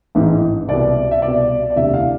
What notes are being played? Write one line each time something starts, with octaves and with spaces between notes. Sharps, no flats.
A1 G#2 E3
C2 B2 D5
E5
C2 B2 D5
D5
E1 D2 C3 E3 E5
F5